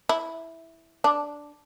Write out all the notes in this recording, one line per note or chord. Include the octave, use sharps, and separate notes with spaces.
E4
D4